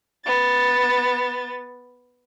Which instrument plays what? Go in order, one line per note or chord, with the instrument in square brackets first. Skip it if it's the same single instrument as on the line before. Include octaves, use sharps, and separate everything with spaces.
[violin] B3 A6